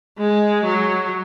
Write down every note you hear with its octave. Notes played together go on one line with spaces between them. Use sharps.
G#3
F#3